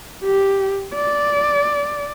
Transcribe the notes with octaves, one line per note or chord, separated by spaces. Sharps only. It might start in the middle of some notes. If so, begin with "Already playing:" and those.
G4
D5